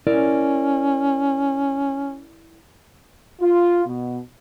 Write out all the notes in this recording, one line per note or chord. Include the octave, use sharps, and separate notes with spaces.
C#4 E4 A#4 D5
F4
B2